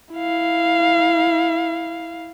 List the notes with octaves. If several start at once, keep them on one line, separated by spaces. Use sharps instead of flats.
E4 F5